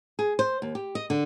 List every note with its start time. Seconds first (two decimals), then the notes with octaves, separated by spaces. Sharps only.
0.19 G#4
0.39 C5
0.62 D#2
0.75 G4
0.95 D#5
1.10 D3